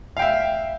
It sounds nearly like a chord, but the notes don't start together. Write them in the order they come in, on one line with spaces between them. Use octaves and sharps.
F5 G5 E5